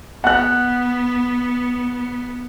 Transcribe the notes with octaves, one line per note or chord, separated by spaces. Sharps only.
B3 F#5 F#6